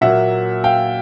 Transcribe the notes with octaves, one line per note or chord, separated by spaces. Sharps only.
A#2 F#3 A#3 E5 F#5
F5 G5